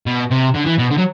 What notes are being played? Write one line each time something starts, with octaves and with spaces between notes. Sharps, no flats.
B2
C3
D3
E3
B2
D3
F#3